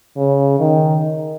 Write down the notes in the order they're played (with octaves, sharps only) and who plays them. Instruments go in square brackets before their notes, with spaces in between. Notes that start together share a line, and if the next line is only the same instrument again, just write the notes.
[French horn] C#3
D#3